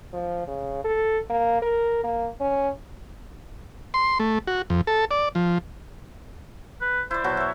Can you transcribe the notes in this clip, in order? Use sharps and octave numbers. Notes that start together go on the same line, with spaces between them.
F3
C#3
A4
A#3
A#4
A#3
C#4
C6
A3
F#4
F2
A4
D5
F3
B4
E4 C5 D5
B2 F#3 F#4
C#5 E5